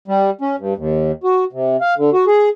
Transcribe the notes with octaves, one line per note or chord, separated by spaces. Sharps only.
G3
C#4
G2
D#2
F#4
C3
F5
D3
F#4
G#4